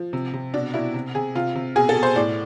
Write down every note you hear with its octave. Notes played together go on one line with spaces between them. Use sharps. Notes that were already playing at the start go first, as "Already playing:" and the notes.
Already playing: F3
C3
C3
B2 D4
B2 E4
C3
C3 G#4
C3 F4
C3
B2 G#4
A4
B2
C5
A2 D5